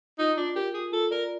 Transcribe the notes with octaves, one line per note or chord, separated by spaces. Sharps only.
D#4 F4
D4 F4
G4 A#4
F4 G#4
F4 A4
A#4 D5